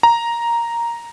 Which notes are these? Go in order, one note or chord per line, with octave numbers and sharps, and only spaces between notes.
A#5